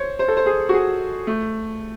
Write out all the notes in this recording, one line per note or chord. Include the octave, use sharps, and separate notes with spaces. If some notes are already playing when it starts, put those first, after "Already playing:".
Already playing: C5 C#5
C5
A4
C5
G#4
F#4
G#4
A3